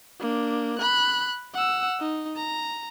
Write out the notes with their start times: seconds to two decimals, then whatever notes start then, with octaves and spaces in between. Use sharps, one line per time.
0.20 A#3 D4
0.79 B5 F#6
1.54 F#5 E6
2.00 D#4
2.36 A#5